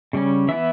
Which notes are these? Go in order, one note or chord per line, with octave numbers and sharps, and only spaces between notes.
C#3 G3 C#4
E3 B3 E4 E5